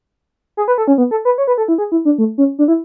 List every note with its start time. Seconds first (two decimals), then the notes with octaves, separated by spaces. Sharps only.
0.57 G#4
0.68 B4
0.78 A4
0.88 C#4
0.98 B3
1.11 A4
1.25 B4
1.38 C#5
1.47 B4
1.58 A4
1.68 E4
1.78 G#4
1.92 E4
2.05 D4
2.18 A3
2.38 C#4
2.59 D4
2.68 E4